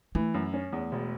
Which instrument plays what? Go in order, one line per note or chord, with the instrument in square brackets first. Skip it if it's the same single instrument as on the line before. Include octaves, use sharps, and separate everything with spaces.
[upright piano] E3 [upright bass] A3
[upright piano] F#2
C#4
E2
E1